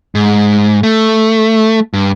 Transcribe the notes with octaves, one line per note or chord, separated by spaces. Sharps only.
G#2
A3
G2